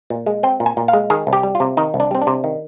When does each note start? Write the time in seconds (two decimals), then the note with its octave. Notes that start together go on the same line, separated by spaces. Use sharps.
0.10 A#2
0.26 G#3
0.43 C4 G5
0.60 A#2
0.66 G#5
0.77 A#2
0.88 F5
0.93 G#3
1.10 D#3 G#4
1.27 C2
1.33 G4
1.43 G3
1.55 F4
1.60 C3
1.77 D#3 D#4
1.94 C2
2.00 D4
2.11 G3 C4
2.22 D4
2.27 C3
2.44 D#3